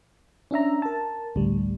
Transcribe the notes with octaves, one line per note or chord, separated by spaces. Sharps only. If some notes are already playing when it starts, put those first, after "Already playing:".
C#4 D4 E5 A#5
A#4 A5
A1 D2 G3